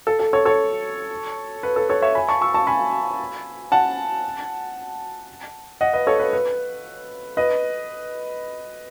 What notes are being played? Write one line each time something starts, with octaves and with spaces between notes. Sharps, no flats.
A4
A4
A4 C#5
A4 C#5
B4
A4
A4 C#5
C#5 E5
G#5 B5
A5 C#6
C#6 E6
A5 C#6
G#5 B5
F#5 A5
D#5 F#5
B4 D#5
A4 C#5
B4
B4
B4 D#5